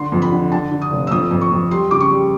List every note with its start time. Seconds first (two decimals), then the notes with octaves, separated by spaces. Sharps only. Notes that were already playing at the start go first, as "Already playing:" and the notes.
Already playing: D3 C6
0.12 F2
0.22 B5
0.32 D3
0.52 D3 A5
0.71 D3
0.82 D#6
0.91 F1
1.07 E6
1.11 F2 D#6
1.31 F2
1.41 C#6
1.51 F2
1.71 G3 C6
1.91 C#3 D6
2.00 C#6
2.10 G3